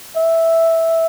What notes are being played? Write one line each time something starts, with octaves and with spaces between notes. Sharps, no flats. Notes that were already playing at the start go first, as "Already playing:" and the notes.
E5